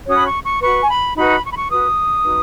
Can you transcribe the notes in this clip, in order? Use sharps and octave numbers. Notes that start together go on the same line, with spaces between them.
C#4 F#4 C#5 D#6
B5
C#6
C#6
F#4 B4 C#6
G#5
B5
D#4 F#4 B4 B5
C#6
B5
C#6
F#4 B4 D#6
D#4 F#4 B4